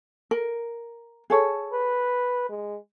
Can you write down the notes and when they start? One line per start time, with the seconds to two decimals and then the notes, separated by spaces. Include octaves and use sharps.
0.31 A#4
1.30 G#4 A4 C#5
1.73 B4
2.50 G#3